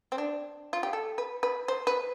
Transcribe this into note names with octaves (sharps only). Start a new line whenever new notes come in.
C4
D4
F4
G4
A4
B4
B4
C5
B4